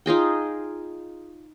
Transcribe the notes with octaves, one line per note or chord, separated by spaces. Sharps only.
D#4 F4 G#4 G5